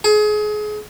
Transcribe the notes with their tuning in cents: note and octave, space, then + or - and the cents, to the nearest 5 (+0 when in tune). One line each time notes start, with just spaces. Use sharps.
G#4 +30